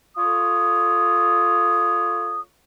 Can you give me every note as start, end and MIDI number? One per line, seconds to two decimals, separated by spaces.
0.17 2.41 65
0.17 2.41 69
0.17 2.41 73
0.17 2.41 87